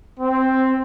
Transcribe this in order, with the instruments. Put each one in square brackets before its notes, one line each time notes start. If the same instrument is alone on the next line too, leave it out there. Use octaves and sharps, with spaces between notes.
[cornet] C4